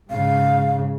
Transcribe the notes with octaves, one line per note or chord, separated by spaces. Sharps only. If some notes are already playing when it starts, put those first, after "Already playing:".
G#2 C#3 F5